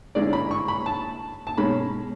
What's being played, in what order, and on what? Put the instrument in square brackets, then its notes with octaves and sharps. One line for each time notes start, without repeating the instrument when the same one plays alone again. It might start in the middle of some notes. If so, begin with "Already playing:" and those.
[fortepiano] D3 G#3 C#4 E4 D5
B5
C#6
B5
A5
A5
B2 G#3 C#4 B5